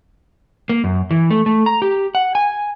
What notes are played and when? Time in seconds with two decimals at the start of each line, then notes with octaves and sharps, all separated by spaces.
0.69 A#3
0.84 F#2
1.11 E3
1.31 A3
1.46 A3
1.66 A#5
1.82 G4
2.15 F#5
2.35 G#5